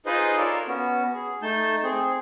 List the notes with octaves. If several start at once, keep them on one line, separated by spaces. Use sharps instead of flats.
D#4 F4 G#4 B4 C5 D#5
F4 A4 A#4 C#5 D5 A5
B3 C#4 F#4
G#4
A3 D#4 A5 G6
C4 G#4